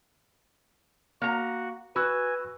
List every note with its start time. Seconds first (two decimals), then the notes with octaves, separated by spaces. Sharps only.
1.22 A#3 F#4 F#5 A#5
1.96 F#4 B4 G#5 B5 E6 F#6